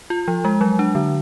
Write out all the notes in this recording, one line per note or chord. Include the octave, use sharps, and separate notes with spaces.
F4
F3
G#3
F#3
D4
D3